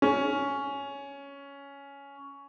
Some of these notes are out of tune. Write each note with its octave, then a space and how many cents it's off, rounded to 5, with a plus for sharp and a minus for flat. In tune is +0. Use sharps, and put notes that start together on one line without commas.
C#4 +10